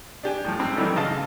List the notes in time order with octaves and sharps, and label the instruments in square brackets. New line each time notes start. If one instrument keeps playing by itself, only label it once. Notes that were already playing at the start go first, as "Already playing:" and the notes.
[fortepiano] D4 G4 G#5
A2 F3
G#2 C4
D#3 E3 F#3 G3 A3 C#4
C#3 D#5 F5 A5